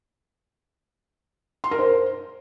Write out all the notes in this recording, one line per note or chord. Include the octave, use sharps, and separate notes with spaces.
C6
A#4
C5